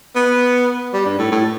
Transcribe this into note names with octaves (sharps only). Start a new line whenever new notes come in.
B3
G3
G2
A2
A2